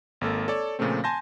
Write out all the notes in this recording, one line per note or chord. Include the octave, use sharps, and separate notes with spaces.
G#1 A#3 A4 A6
A4 C#5 D5 A5
A#2 C#3 F3 A3 C4
G#5 A5 C6 G6 A#6